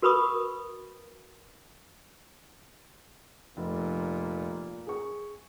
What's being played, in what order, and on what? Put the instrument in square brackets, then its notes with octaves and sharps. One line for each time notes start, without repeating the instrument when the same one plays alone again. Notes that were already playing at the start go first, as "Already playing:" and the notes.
[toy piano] F#4 A#4 B4 B5 C#6 D#6
[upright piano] F1 [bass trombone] A#2
[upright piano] G#4 C#6